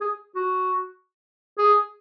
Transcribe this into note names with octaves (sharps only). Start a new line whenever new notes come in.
G#4
F#4
G#4